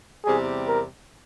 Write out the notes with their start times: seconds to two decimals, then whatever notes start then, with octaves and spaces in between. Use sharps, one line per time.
0.24 E2 C3 G3 C4 G#4
0.68 A#4